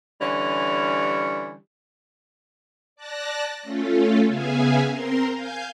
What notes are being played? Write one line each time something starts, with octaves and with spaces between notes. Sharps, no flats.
D3 E3 G3 C#4
D5 A5 F#6 A#6
A3 C#4 F4 A4
C#3 B3 G#4 E5 F5 G#5
C4 A#4 A#5 C6
F5 G#5 G6